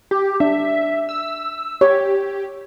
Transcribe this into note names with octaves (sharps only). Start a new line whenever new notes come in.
G4
D4 E5
E6
G4 C#5